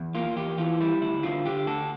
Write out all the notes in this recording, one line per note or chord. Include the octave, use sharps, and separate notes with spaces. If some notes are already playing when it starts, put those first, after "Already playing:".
Already playing: E2
A#3 F4
E2 G4
E3 F4
G3 E4
D2 E4
D3 F4
D3 G4
D2 A4